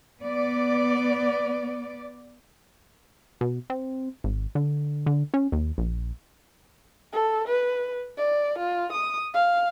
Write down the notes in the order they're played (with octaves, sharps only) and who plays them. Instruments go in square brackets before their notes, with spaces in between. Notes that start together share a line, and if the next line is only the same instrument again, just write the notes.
[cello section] B3 D5
[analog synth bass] B2
C4
G#1
D3
D3
C#4
D#2
A#1
[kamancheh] A4
B4
D5
F4
D#6
F5